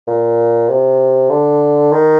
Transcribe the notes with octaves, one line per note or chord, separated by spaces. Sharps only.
A#2
C3
D3
D#3